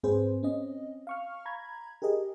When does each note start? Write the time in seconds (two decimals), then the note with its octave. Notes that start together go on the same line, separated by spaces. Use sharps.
0.03 G#2 C4 G#4 B4 C5
0.43 C4 C#4 D#5
1.07 F5 C#6 F6
1.45 A#5 B5 G#6
2.02 G4 G#4 A#4 D#5